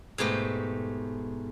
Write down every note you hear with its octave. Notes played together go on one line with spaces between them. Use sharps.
G#2 B2 A3 G4